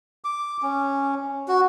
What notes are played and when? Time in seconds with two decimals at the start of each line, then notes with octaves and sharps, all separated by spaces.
0.24 D6
0.62 C#4
1.48 F#4